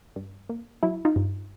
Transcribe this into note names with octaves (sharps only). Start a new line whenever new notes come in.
G2
A#3
F#3 E4
D#4 F4
G2